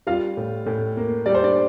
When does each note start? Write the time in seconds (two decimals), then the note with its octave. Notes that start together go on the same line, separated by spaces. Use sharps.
0.07 G3 F4 F5
0.37 A2
0.66 A2
0.97 A#3
1.26 G3 D5
1.35 C5
1.43 D4 D5